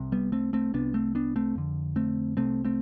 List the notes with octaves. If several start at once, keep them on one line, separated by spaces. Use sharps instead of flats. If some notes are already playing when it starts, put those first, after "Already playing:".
Already playing: C2 C3
G3 B3
A3 C4
A3 C4
C2 C3 B3 D4
A3 C4
B3 D4
A3 C4
F2 D3
A3 C4
C2 C3 A3 C4
A3 C4